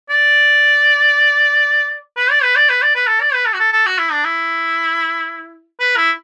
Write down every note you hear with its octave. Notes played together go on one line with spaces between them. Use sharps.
D5
B4
D5
B4
D5
B4
D5
B4
A4
D5
B4
A4
F#4
A4
A4
F#4
E4
D4
E4
B4
E4